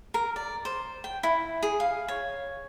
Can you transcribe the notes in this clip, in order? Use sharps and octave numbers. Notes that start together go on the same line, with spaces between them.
A#4
D5
C5
G5
E4
G#4
F5
C#5